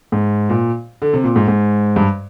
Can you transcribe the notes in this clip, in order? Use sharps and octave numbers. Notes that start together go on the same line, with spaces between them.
G#2
A#2
D3
C3
A#2
G#2
G#2
G2